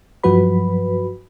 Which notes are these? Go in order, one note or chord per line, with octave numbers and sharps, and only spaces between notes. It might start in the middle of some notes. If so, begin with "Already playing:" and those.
G2 F3 F#3 F#4 B4 B5